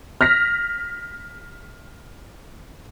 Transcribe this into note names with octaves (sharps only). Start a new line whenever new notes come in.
F6 A#6 B6